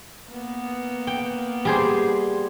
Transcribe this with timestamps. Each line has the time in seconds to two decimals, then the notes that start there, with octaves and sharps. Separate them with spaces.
0.29 A#3 B3
1.07 G5
1.65 G3 G#4 C5